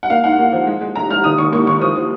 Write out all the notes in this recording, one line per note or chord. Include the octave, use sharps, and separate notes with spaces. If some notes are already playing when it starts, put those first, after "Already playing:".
F#5
A#3 F5
G#2 F#5
A#3
F3
G#3
G#3
F1 A#5
F1 F6
D#2 D#6
D#2 C#6
A#3 C#6
D#2 C#6
F3 D#6
F3